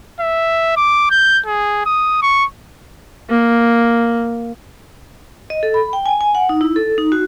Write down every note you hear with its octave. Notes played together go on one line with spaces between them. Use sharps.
E5
D6
G6
G#4
D#6
C#6
A#3
D#5
A4
B5
G5
G#5
G#5
F#5
D#4
E4
A4
D#4
F#4